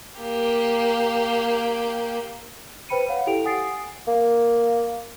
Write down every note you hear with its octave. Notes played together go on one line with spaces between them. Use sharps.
A#3 G4
B4 C5 G5 B5 C#7 D#7
C#5 F5 F#5
E4 G4 A4 G5 D7 F7
F#5 G#5 D#6 A6 C7 D7
A#3